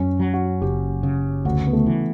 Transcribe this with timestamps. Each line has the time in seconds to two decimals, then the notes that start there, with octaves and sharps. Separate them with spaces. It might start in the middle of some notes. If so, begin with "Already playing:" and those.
Already playing: F#2 C#4
0.20 F#3
0.34 F#4
0.61 F#1 G4
1.03 C#3
1.45 D2 F#4
1.67 B3
1.73 A3
1.86 E3